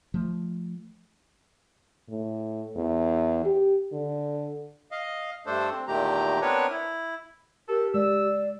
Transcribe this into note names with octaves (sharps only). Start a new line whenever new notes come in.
F3 A3
A2
E2
G4
D3
D#5 F5
G2 A3 D4 A4 C5
C4
E2 A#2 D#3 A3 G4 A#5
B3 C4 D4 A#4 B4 C#5
E4
G4 A4 A#4
G#3 D5 E6